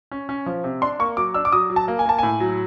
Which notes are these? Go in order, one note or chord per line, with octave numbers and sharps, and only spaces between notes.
C#4
C#4
F3
C3
D4 C6
A#3 C#6
F#3 D6
D4 E6
D6
F#3 D#6
F#3
A5
A#3
G#5
A#3 A5
A2 G#5
F#3